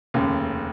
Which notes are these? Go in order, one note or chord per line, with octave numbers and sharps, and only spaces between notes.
F1 D#2 C#3